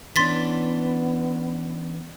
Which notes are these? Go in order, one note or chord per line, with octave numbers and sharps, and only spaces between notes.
E3 B3 C#4 D4 C6 A6 B6